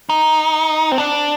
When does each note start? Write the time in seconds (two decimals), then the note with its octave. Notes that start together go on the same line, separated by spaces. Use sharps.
0.09 D#4
0.92 C4
0.98 D4